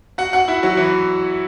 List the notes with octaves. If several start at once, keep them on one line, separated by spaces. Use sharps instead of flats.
F#4 F#5
F#4 F#5
E4 E5
F#3 F#4
E3 E4